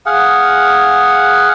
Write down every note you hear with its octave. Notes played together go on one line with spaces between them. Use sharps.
G#4 F5 F#5